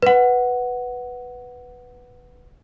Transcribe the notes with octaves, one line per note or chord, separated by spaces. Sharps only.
B4 F#5